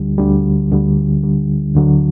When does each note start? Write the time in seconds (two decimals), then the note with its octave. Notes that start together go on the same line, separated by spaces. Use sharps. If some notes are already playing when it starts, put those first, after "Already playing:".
Already playing: D2 D3 G3
0.18 D2 D3 G3
0.71 D2 D3 G3
1.23 D2 D3 G3
1.76 D2 D3 F#3